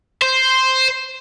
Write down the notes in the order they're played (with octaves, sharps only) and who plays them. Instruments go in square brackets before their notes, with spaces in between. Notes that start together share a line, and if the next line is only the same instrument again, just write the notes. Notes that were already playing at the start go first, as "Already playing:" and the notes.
[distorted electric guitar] C5